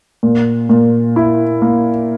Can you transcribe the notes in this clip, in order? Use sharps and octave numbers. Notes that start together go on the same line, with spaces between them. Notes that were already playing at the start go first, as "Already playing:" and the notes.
A#2
A#2
E4
A#3